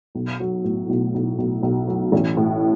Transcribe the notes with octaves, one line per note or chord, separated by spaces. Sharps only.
B1
F#3
A2
B1
B1
B1
B1
F#3
A1
A2